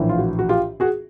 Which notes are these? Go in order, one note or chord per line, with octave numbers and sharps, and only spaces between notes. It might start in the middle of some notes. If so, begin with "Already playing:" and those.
Already playing: A#1 A2 E3
F4
F#4
F#4
F4 G4
F#4 G#4